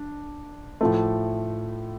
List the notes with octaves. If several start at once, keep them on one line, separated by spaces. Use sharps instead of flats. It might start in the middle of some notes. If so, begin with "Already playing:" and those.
Already playing: D4
A2 F3 A3